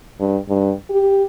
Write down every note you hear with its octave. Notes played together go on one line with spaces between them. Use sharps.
G2
G2
G4